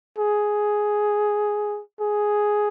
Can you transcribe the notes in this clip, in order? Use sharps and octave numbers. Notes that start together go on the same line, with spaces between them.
G#4
G#4